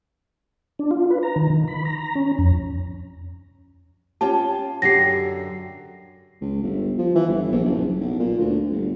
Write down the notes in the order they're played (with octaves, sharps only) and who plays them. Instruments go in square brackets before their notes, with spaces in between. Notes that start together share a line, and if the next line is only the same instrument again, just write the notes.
[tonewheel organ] D4
F4
B4
A#5
D#3
D#3
B5
A#5
A#5
C#4
F2
[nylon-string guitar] C#4 F4 G4 [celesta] A5
[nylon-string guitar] F#2 D3 G4 [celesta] A#6 C7
[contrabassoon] C#2
G1
F3
E3
G1
A#1
F#1
B1
A#2
D2
G1